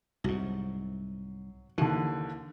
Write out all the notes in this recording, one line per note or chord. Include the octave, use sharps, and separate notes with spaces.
C2 G#2 F#3
D#2 D3 E3